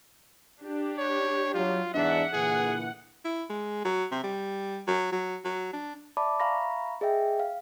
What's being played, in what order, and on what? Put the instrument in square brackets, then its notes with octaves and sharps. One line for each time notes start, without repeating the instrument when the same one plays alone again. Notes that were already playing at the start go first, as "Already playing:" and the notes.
[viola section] D4 G4
[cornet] C#5
[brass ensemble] F#3 [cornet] F4
[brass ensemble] E2 G#2 D4 [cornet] E5 [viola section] F#5
[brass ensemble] A#2 D3 E3 [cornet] G#4
[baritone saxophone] E4
G#3
F#3
C3
G3
F#3
F#3
F#3
D4
[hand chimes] D5 E5 A5 B5 D6
E5 F5 A#5 B5 C#6 A#6
G#4 D#5 E5 G5
F5